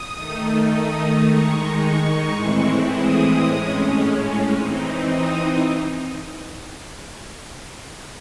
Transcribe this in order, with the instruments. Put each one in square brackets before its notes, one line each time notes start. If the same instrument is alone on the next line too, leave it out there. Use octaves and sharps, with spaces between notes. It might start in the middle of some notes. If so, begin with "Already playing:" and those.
Already playing: [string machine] D#6
D#3 A3 D#4
D#6
D#3 G#3 D#4 C#6
C#6
A2 E3 G#3 C4 E4
D#6
A2 G#3 C#4
E3 C4 D#4
D#6